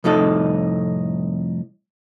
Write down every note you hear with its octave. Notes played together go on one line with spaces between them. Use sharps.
C2 F2 A2 D#4 A4